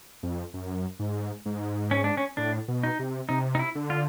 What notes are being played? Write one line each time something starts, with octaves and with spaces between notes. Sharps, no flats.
F2
F#2
G#2
G#2
C#4
D4
C#4
A2 D4
B2
D#4
C3
C3 D#4
D#4
E4
D3
F4